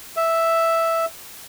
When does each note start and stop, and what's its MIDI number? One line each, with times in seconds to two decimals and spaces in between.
0.17 1.06 76